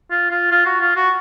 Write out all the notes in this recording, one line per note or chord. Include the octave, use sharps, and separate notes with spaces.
F4
F4
F4
F#4
F4
F#4